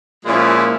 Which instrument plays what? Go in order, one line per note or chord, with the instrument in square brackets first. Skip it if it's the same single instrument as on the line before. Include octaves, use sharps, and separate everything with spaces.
[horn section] A#2 F3 G#3 C#4 E4